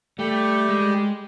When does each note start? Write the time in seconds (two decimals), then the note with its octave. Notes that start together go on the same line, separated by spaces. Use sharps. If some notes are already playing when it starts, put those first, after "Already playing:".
0.19 G3 A3 G4
0.69 G#3